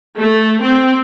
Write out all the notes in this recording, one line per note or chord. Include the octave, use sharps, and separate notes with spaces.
A3
C4